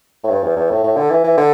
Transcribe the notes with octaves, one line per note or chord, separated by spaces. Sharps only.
A2
G2
E2
E2
A2
A2
D3
E3
E3
D3